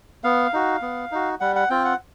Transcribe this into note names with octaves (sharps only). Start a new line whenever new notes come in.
B3 F5
D#4 F#4
B3
D#4 F#4
G3 F#5
F#5
C4 F4 G5
F#5